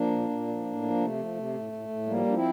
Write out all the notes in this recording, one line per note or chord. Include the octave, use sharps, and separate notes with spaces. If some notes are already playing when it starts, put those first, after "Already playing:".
Already playing: F3 A#3 D4
A#2
A#2
F3
A2
F3
C3 A3
F3
C3
A2
A2
A2
F3 G3 A#3
F3 D4
C4 E4